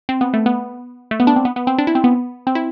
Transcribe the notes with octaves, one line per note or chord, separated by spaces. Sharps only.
C4
B3
A3
B3
A3
B3
D4
C4
B3
B3
C4
D4
E4
C4
B3
C4
E4